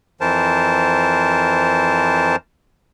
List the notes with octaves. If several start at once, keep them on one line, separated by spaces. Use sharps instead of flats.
F2 E3 A#4 C5 A5